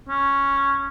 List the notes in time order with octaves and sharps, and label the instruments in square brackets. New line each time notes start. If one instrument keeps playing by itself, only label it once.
[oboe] C#4